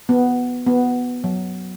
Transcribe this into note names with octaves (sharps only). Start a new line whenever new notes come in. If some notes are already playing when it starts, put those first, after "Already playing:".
B3
B3
F#3